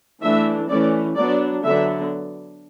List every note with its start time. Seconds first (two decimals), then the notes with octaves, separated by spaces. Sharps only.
0.21 E3 A3 D4 E5
0.69 E3 A3 C#4 D5
1.16 F#3 B3 D4 D5
1.63 D3 F#3 B3 D4 E5